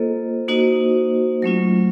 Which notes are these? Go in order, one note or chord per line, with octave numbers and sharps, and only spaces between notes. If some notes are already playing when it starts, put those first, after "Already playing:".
Already playing: A#3 F4 A4 C5 D#5
A#3 D#4 F#4 C5 D#5
F#3 A3 C#4 F4